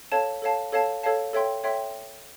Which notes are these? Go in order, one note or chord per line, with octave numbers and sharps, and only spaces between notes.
A4 C#5 F5 A5
A4 C#5 F5 A5
A4 C#5 F5 A5
A4 C#5 F5 A5
A4 C#5 E5 G5 C6
A4 C#5 E5 G5 C6